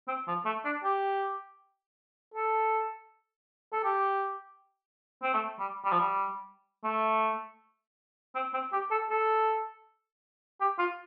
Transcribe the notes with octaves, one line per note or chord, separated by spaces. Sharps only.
C4
F3
A3
D4
G4
A4
A4
G4
C4
A3
G3
G3
F3
G3
A3
C4
C4
G4
A4
A4
G4
F4